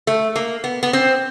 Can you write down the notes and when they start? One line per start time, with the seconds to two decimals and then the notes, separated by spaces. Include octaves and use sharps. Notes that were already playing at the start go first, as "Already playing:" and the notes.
0.07 A3
0.36 A#3
0.64 B3
0.83 B3
0.93 C4